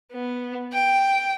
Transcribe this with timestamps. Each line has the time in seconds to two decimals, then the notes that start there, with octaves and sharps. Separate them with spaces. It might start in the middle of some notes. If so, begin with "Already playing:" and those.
0.13 B3
0.73 G5